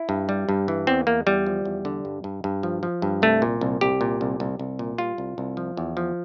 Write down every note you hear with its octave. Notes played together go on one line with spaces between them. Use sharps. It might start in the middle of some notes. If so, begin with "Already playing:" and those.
Already playing: E4
G2
G3
G2
E3
E2 C4
E2 A#3
E2 G3
F3
E2
D3
G2
G2
G2
F3
F3
G2
C2 A3
A#2
C2
C2 G4
A#2
C2
C2
C2
A#2
G3 F4
C2
C2
F3
E2
F3